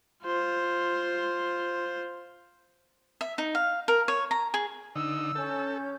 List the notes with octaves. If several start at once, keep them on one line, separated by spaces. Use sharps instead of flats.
F4 C5
E5
D#4
F5
A#4
C#5
A#5
G#4
D3 D#4 E6
C#4 A4 G6